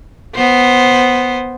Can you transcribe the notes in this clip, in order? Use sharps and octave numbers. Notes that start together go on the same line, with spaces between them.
B3 C5